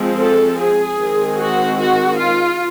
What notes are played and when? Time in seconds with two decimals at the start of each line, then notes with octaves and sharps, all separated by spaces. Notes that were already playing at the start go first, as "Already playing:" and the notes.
Already playing: F3 G#3 C4
0.20 A4
0.60 G#4
0.99 D#3 G#3 C4
1.38 F#4
1.78 F#4
2.19 F4